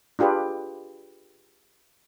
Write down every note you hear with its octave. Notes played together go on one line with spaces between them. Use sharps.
D4 F4 G4 G#4 B4